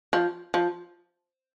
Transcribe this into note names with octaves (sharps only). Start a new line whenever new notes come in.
F3
F3